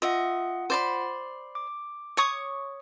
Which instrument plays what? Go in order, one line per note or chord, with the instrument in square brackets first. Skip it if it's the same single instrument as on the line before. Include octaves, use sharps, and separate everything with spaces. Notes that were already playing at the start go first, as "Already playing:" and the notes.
[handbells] F4 F#5 [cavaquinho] D#5 E5
[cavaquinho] C5 D5 B5
[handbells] D6
[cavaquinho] C#5 C#6 D#6